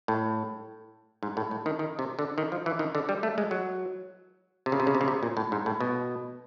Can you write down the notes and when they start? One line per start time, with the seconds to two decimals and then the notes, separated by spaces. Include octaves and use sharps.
0.08 A2
1.23 G#2
1.37 A2
1.51 A2
1.66 D#3
1.79 D#3
1.99 C3
2.19 D3
2.38 D#3
2.52 F3
2.66 E3
2.79 D#3
2.95 D3
3.09 G3
3.23 A3
3.38 G#3
3.51 F#3
4.66 C3
4.72 C#3
4.80 C3
4.87 C#3
4.95 C3
5.01 C#3
5.08 C3
5.23 A#2
5.37 A2
5.52 G#2
5.66 A2
5.80 B2